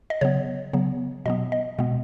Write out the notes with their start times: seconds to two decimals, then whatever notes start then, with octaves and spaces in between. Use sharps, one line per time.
0.10 D#5
0.21 C#3 F#3 B3 C#5
0.73 C#3 F#3 B3
1.26 B2 F#3 B3 D#5
1.52 D#5
1.79 B2 G#3 B3